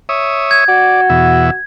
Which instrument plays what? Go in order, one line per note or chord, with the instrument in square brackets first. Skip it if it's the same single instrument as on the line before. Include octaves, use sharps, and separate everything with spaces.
[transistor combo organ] C#5 E5 D#6
[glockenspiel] G#6
[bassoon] F#4 [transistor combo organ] D5
[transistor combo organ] E2 B2 E5